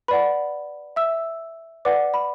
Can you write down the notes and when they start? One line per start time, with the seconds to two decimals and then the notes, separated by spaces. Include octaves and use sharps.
0.08 B4 D5 F#5 B5
0.96 E5 E6
1.85 B4 D5 F#5 D6
2.14 B5